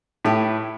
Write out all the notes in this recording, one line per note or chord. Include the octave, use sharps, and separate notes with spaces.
A2 E4 G4 B4